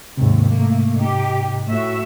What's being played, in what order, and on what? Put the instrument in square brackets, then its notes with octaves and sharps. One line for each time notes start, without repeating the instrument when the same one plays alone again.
[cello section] D#2 [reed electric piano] G#2 C3
[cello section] A3 A#3
D#4 G4
A2 F#4 E5